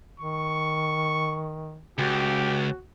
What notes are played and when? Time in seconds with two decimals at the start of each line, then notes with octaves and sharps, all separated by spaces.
0.19 D#3 C#6
1.98 C#2 F#4 G4